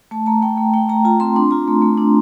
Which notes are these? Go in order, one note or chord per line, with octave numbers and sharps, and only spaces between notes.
A3 A5
A3 A#5
A3 G5
A3
A3 G5
A3 A#5
F4 A#5
C4 C6
D4 C6
F4 A#5
A3
A3
D4